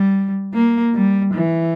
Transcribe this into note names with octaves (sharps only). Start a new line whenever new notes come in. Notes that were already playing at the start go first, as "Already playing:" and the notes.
Already playing: G3
A#3
G3
E3